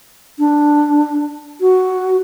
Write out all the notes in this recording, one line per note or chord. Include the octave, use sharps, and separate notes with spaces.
D4
F#4